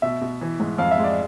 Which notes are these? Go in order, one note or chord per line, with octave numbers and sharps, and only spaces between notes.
B2 E5
B2
E3
G#2
F2 F5
E5
G#3
D5